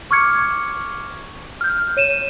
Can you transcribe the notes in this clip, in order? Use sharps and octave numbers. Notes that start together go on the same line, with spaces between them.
C#6 D6 F6 G#6 C#7
F6 G6
C#5 D#7 E7